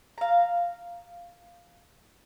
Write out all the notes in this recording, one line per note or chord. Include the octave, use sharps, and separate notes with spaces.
F5 A#5